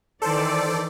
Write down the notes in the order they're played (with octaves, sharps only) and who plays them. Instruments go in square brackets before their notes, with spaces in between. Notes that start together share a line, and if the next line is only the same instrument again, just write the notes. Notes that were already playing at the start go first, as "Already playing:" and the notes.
[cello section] D#3 E3 D5 [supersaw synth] A4 C5